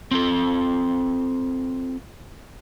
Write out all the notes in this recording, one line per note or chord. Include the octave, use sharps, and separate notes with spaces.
C4 F4 A4